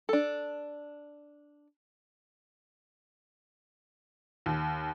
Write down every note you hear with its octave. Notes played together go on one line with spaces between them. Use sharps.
D4 A4
D#2